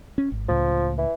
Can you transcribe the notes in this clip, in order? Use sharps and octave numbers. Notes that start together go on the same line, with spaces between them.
C#4
G#1
C#2 A2 F3
E3